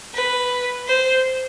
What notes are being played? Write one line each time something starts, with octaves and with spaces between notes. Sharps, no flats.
B4
C5